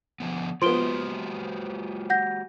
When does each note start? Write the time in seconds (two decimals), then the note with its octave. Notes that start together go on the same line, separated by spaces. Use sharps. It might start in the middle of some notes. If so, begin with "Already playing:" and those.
0.20 D3 F3 B3
0.62 F3 G#3 B3 F#4 G4 C6 D7 G7
2.10 F#5 G6 A#6